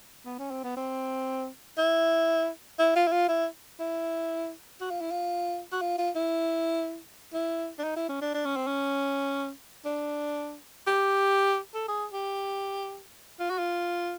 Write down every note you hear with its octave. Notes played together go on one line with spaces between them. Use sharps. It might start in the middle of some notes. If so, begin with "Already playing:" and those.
B3
C#4
C4
B3
C4
E4
E4
F4
E4
F4
E4
E4
F#4
F4
E4
F4
F#4
F4
F4
E4
E4
D4
D#4
E4
C#4
D4
D4
C#4
C4
C#4
D4
G4
A4
G#4
G4
F4
F#4
F4